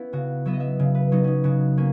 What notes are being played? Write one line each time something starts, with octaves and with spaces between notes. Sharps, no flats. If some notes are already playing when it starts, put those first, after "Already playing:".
Already playing: B3 C#4 E4
C#3 F#4
F#3 B3 E5
D#5
E5
C#3
B4
F#3 B3 D#4
C#4 D#4
C#3 F#4
A#3 C#4